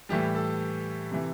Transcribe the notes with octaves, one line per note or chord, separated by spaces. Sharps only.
A2 E3 G3 G4
A4
C3 E3